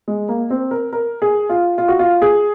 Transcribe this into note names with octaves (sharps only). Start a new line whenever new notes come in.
G#3
A#3
C4
A#4
A#4
G#4
F4
F4
F#4
F4
G#4